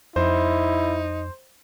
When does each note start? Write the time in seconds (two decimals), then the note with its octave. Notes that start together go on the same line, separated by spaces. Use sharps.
0.16 F2 D#4 E4 C5